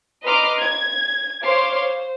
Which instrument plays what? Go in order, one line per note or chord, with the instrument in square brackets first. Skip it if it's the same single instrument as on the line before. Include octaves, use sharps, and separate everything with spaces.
[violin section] B4 D#5 A#5 C6 D6 F6
G#6
C5 C#5 F5 C6 D6
C5